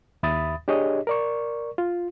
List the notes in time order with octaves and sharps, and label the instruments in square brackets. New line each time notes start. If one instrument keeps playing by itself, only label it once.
[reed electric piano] D#2 E5 B5 D#6 A6
D4 G4 G#4 C#5 D#5
A#4 D5 C#6
F4